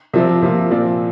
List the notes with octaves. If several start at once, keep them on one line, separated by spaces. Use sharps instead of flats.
C3 F3 C4 E5
C3 F3 A#3
A#2 F3 C4 D5